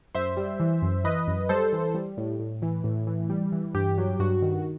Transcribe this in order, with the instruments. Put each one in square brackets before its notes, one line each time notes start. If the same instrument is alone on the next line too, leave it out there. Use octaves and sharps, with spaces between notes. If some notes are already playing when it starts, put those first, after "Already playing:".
[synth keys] F#2 C5 E5
G3
E3
F#2
E3 B4 D#5
F#2
G3 A4 C5
E3
G3
A2
A2
E3
A2
E3
G3
E3
G2 G4
F#3
G2 F#4
D#3